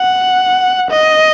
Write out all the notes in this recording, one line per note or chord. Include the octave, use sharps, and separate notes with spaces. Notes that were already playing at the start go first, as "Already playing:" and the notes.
Already playing: F#5
D#5